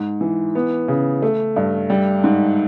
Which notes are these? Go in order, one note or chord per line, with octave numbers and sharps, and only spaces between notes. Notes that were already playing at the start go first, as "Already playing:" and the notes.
Already playing: G#2
E3
B3
C#3
A3
G2
G3
G#2